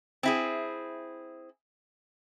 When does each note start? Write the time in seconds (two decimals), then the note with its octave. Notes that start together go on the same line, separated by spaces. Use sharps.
0.23 C4 E4 G#4